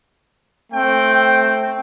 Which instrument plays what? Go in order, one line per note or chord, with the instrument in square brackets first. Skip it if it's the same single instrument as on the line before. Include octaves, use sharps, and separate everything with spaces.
[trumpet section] A3 C4 G5